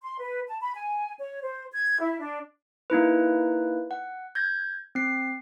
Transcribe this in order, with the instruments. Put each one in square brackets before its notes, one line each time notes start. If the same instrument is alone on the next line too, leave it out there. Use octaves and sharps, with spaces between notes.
[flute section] C6
B4
A5
B5
G#5
C#5
C5
G#6
E4
D4
[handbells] A#3 D#4 E4 B4
F#5
G6 G#6 A#6
C4 C7